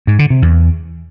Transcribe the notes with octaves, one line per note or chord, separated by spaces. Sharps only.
G#2
D3
C3
E2